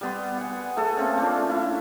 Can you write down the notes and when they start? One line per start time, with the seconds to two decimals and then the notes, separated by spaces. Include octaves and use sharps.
0.01 G3 B3 C6
0.38 F#5 G#5
0.77 A3 G#4 A4
0.97 A#3 C4 C#4
1.17 A3 C#4 D4 F4
1.50 E4